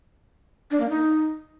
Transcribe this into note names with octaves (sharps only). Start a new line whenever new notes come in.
D4
A#3
D#4